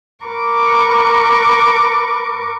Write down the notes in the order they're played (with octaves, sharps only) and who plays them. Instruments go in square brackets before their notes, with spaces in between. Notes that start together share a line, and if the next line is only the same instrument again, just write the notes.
[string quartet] A#4 B4 C#6 D6